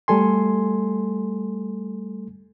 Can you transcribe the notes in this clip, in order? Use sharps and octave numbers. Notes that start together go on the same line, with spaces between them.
G3 A3 A4 G#5 C6